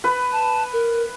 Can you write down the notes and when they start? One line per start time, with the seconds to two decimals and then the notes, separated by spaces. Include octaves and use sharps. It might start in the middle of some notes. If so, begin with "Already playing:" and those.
0.04 B4
0.32 A5
0.73 A#4